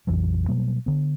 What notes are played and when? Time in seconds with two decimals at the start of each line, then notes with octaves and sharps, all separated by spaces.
0.07 A#1 F2 E3 F#3
0.48 B2 F#3 G3 A#3
0.86 D3 B3